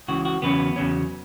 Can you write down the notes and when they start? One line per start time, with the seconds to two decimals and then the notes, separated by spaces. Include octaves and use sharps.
0.08 C#2 C#3 E3 F#4
0.25 F#4
0.42 E2 C#3 F#3 B3 C#4 B4
0.76 E2 C#3 F#3 C#4